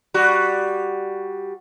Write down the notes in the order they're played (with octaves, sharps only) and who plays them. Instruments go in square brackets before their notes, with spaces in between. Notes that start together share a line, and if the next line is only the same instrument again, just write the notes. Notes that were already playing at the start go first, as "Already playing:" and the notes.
[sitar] G3 F#4